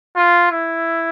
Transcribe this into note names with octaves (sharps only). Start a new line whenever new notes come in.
F4
E4